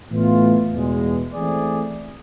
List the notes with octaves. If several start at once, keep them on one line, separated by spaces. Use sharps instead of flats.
A2 E3 B3 F4
E2 B2 G#3
E3 A3 C4 G#4 D5